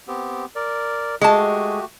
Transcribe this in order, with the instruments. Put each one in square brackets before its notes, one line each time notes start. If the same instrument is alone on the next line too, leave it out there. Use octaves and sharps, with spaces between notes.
[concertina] B3 C4 G4
A#4 D5
[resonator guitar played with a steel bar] G#3 A5 [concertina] A3 F#4 G4